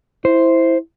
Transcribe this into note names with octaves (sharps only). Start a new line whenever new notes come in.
E4 C5